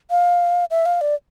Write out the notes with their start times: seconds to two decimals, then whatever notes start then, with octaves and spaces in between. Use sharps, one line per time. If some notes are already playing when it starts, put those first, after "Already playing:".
0.11 F5
0.71 E5
0.86 F5
1.01 D5